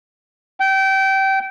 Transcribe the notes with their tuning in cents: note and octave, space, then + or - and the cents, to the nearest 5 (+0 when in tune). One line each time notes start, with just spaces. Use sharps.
G5 -25